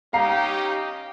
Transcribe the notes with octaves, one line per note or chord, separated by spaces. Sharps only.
C#4 D#4 G4 F5 A#5 C7